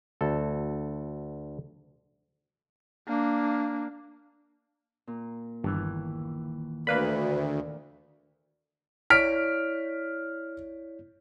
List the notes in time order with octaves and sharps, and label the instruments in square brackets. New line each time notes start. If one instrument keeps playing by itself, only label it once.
[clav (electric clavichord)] D2 A4
[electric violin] A#3 D4
[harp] A#2
[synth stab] G1 [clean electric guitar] D#2 E3
[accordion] D2 [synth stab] A#3 B4 B5 [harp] A#4 D5 F5
[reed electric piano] E4 C#5 D5 [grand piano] F6 B6 D7